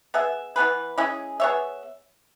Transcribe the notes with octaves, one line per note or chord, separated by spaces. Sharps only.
B3 G#4 E5
E3 B3 G#4 B4
G#3 C#4 E4 G#4
B3 G#4 C#5 E5